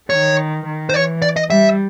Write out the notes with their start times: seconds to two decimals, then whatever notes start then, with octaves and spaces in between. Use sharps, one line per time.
0.10 D#3 C#5
0.66 D#3
0.89 C5
0.94 E3 C#5
1.22 D5
1.36 D#5
1.50 G3 E5